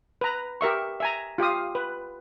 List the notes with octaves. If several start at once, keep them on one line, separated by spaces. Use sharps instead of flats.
B4 A#5
G4 A#4 E5 C#6
E5 G#5 A#5
F4 G4 F5 D#6
B4